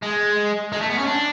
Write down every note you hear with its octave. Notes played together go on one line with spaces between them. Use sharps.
G#3
G#3
A3
B3
C#4
D4